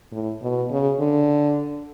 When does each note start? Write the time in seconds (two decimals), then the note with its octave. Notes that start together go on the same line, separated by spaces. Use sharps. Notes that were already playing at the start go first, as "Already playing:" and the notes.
0.12 A2
0.42 B2
0.71 C#3
1.00 D3